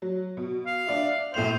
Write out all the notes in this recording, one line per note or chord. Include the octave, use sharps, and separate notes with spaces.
F#3
B2
F5
D4 D5 E5
A#1 A2 C5 F7